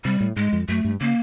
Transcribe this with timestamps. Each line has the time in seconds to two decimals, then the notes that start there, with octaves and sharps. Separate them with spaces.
0.05 C3 G3
0.21 A2
0.36 G#2 G#3
0.53 F2
0.68 F#2 A3
0.84 G2
1.01 C#3 A#3